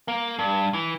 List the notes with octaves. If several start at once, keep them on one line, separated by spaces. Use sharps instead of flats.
A#3
G2
E3